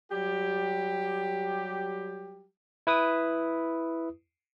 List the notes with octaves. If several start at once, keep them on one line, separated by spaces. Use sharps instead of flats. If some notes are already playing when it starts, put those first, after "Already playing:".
F#3 G3 G4
E4 B4 D#6